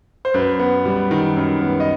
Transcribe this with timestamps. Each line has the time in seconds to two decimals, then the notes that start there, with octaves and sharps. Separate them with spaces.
0.25 C5
0.34 F#2 B4
0.59 B3
0.85 G3
1.11 D#3
1.37 F#2
1.62 B3
1.80 D#5